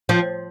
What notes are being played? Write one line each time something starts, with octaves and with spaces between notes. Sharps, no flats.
F3